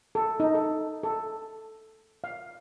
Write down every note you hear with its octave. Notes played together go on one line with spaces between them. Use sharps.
A4
D#4
A4
A4
F5